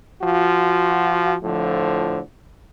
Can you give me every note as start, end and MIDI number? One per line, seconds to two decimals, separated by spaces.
0.23 1.36 53
0.23 1.36 65
0.23 1.36 66
1.43 2.20 45
1.43 2.20 50
1.43 2.20 53